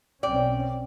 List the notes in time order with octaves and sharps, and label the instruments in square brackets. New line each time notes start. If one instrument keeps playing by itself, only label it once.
[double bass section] B1 C4 C#4 [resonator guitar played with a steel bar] D5 [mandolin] G5